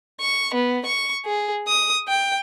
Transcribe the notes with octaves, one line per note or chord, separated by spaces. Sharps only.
C#6
B3
C#6
G#4
D#6
G5